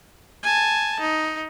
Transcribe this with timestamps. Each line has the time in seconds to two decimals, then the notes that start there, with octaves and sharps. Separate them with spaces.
0.43 G#5 A5
1.00 D#4